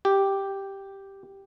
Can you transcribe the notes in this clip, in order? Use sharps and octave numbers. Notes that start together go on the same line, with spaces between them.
G4